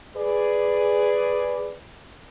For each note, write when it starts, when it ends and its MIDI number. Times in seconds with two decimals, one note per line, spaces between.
0.16 1.76 68
0.16 1.76 71
0.16 1.76 74